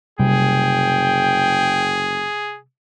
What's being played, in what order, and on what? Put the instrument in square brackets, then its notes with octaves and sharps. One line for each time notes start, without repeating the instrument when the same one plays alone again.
[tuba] F#1 [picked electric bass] C3 G3 [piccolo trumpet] G#4 [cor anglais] G5